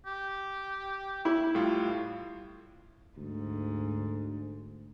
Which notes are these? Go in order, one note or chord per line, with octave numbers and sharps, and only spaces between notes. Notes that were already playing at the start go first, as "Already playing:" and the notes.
G4
E4
A2 G3 F4
D2 G#2